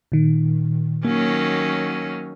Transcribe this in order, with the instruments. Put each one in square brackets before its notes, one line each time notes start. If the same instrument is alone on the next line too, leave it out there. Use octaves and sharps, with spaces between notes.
[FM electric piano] A#2 D#3
[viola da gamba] D#3 F#3 C#4 [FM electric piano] A#3